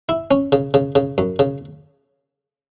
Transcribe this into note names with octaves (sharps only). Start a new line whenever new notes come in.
E4
C#4
C#3
C#3
C#3
F#2
C#3